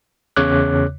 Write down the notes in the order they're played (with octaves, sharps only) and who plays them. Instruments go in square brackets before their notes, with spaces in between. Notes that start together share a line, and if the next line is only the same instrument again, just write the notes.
[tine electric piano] E2 C#3 C#5 D6 F#6